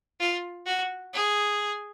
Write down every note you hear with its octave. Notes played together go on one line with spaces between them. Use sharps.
F4
F#4
G#4